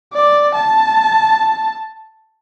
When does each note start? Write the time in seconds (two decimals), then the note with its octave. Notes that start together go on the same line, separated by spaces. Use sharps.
0.13 D5
0.55 A5